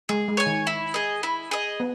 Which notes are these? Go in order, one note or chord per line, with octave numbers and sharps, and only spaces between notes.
G#3 G#4
G#3
C#5 G#5
D#3
E4
G#4 D#5
E4
G#4 D#5
B3